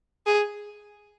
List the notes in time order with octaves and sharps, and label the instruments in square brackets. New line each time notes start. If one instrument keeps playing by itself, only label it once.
[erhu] G#4